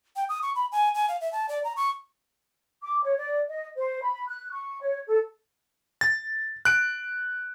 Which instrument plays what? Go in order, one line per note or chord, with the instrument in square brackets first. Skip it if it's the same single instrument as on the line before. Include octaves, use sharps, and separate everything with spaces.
[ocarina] G5
D#6
C#6
B5
G#5
G#5
F5
E5
A5
D5
A#5
C#6
[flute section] D6
C#5
D5
D#5
C5
B5
F#6
C#6
C#5
A4
[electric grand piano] A6
F#6 D7